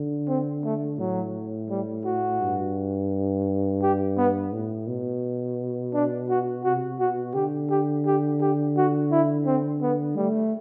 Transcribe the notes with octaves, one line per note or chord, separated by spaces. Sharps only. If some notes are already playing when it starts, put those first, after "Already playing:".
Already playing: D3
C4
A3
A2 F#3
G3
F#4
G2
G4
B3
A2
B2
D4
F#4
C3 F#4
B2 F#4
D3 G4
G4
G4
G4
F#4
E4
C4
B3
G3 A3